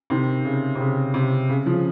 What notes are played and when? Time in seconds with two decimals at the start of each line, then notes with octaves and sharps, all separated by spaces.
0.10 C3 D#3
0.45 C#3
0.75 C3
0.80 C#3
1.14 C3
1.49 C#3
1.66 C#3 F3